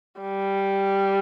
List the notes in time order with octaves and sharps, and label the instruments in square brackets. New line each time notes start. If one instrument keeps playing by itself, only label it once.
[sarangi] G3